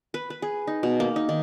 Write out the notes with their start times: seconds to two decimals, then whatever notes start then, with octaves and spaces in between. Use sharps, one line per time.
0.14 B4
0.30 B4
0.42 G#4
0.67 D#4
0.83 B2
1.00 A#3
1.16 D#4
1.29 D#3